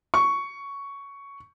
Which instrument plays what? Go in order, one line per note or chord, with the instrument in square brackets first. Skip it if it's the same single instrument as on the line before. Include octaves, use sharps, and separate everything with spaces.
[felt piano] C#6